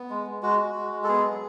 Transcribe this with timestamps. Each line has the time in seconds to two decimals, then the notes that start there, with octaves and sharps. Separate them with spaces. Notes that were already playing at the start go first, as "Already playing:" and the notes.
Already playing: B3
0.10 G#3
0.27 G#3
0.42 G#3 F#4
0.59 F#4
0.76 G#3
0.92 G#3
1.04 A4
1.08 B3 G#4
1.25 F#3